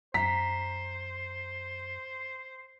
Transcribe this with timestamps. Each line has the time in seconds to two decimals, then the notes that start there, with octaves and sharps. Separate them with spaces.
0.14 F#2 C5 A#5 B6